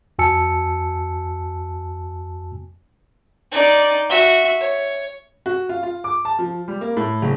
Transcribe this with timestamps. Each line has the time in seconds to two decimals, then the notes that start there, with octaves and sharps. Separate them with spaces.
0.19 F2 F#4 G#5 A5 E6 C#7
3.52 D#4 D5
4.10 F#4 E5
4.60 C#5
5.46 F#4
5.69 F4
5.83 F4
6.04 D6
6.25 A5
6.39 F3
6.68 G3
6.81 A#3
6.97 A2
7.22 F#1